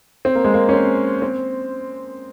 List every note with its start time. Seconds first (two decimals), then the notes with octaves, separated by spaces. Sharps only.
0.25 C4
0.35 A#3
0.44 G#3
0.54 A#3
0.69 C#4
0.73 C4
1.22 C4